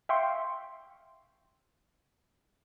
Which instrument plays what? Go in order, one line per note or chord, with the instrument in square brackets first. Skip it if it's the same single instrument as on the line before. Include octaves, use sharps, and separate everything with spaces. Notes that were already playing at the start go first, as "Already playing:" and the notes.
[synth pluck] E5 F5 G5 C6 C#6